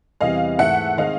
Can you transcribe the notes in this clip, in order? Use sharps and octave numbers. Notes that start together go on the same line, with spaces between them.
E2 C3 E3 G3 D#5 F5
G#2 E3 A3 E5 F#5
D#3 G#3 C4 D#5 F5